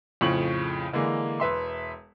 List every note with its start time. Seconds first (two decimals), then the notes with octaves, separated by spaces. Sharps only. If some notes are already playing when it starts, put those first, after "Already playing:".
0.21 F2 A2 C#3 F3 C#6 F#7
0.93 D3 E3 G#3 A#3
1.40 E1 B4 E5 C6